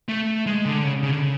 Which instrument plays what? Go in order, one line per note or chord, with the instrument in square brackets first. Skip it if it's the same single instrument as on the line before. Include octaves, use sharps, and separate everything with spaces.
[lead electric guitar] A3
G#3
D3
C#3
C#3
D3
C#3